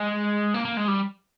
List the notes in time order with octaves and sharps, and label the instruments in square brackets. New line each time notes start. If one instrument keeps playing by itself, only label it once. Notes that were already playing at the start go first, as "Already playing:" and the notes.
Already playing: [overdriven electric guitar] G#3
A#3
A#3
G#3
G3